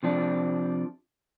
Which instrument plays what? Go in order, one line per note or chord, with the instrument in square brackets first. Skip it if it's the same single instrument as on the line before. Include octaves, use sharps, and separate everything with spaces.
[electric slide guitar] C3 F3 D4